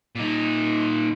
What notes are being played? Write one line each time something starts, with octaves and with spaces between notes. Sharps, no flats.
A#2 D#4